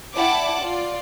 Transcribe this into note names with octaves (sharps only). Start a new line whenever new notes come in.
E4 D5 F#5 G5 A5 D6
F4 D5